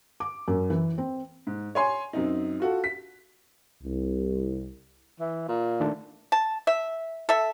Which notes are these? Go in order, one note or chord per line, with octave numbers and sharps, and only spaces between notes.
D6
F#2
E3
C4
G#2
C#5 G#5 C6
F#2 C4 D#4
F4 F#4 A4
B6
C2
E3
A#2
D#3 A3 D4
A5
E5
A4 E5